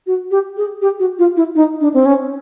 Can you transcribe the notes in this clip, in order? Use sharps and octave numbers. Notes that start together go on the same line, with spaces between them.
F#4
G4
G#4
G4
F#4
F4
E4
D#4
D4
C4
C#4